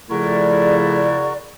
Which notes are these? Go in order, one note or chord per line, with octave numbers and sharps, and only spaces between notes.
C#3 F3 A3 E4 F#4 A#4 D5